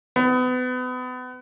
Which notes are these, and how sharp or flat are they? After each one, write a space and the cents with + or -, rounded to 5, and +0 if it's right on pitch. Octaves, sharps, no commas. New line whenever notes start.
B3 +35